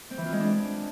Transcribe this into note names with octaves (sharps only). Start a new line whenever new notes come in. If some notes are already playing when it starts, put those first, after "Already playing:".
C4
E3
F4
G#3
D4